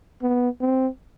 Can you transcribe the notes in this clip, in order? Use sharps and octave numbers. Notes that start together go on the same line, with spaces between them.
B3
C4